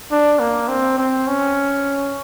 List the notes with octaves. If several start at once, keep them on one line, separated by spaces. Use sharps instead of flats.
D4
A#3
C4
C4
C#4